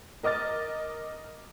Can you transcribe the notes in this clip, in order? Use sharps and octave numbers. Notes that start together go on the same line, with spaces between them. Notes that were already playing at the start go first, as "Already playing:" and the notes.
A#4 D#5 D6 F6 A6